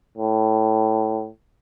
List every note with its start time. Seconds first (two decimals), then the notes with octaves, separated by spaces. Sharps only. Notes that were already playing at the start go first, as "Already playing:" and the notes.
0.18 A2